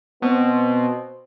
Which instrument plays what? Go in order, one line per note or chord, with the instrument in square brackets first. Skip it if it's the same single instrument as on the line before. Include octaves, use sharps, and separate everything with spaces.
[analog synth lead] B2 [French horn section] C4 C5